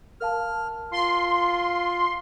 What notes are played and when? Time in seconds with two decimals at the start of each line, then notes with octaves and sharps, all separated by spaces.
0.21 A#4 F5 A5 F6
0.92 F4 C6